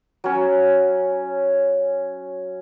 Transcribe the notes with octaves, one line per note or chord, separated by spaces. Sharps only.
F#3 C#4